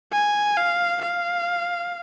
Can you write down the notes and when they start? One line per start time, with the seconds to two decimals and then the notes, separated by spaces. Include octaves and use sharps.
0.12 G#5
0.57 F5
1.02 F5